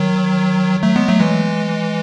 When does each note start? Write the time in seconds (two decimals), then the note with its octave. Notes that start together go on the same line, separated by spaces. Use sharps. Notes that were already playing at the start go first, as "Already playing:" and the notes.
Already playing: D#3 F#3
0.83 F#3 A3
0.96 G#3 B3
1.08 F#3 A3
1.20 E3 G#3